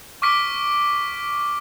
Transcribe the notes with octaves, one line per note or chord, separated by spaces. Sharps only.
C#6 D6 F6 B6 D7 D#7